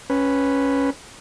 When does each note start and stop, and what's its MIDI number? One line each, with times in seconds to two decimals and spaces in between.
0.10 0.90 61
0.10 0.90 71